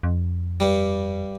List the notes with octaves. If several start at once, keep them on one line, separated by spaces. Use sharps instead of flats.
F2
G2 G3